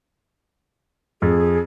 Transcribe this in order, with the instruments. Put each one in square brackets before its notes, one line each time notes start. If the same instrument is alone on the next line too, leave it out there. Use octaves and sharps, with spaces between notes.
[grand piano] F2 [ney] G#4